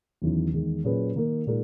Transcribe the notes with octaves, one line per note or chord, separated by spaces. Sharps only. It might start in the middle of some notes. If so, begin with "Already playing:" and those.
E2 D#3 F#3 C#4 E4
E2 D#3 G#3
A#2 F#3 C#4 G#4 B4
D#3 A#3 D#4 A#4
A#2 G#3 D#4 A#4